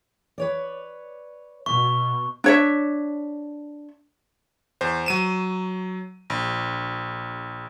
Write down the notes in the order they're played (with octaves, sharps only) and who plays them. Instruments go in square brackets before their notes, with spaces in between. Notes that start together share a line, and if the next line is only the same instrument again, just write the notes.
[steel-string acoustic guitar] B4 C#5 D5
[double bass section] B2 [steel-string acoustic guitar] E5 [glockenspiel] C#6
[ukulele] D4 C#5 E5
[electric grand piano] E2 C5
F#3 D#7 E7
A#1